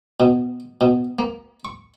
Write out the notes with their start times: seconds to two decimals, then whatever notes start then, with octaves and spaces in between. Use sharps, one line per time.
0.20 B2
0.81 B2
1.19 A#3
1.65 C#6